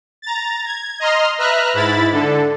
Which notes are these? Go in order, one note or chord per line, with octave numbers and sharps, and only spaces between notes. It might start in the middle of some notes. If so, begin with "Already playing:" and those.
A#5 A6
G#6
D#5 A#5 C6 F6
B4 E5 A#5 F6 F#6
G#2 E4 B5 A6
D3 A4